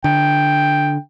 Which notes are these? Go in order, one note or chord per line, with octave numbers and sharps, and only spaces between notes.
D3 G5